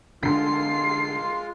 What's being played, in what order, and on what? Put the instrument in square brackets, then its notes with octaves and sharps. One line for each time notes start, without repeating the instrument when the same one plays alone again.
[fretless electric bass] D3 [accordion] G#3 F4 [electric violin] C7